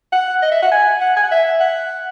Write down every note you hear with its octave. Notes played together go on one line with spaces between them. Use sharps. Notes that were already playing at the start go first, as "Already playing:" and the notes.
F#5
D#5
E5
F#5
G#5
F#5
G#5
F#5
E5
F#5